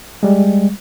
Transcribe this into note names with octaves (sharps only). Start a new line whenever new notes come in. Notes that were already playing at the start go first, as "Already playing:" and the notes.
G3 G#3